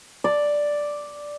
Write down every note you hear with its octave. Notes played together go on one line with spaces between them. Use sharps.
D5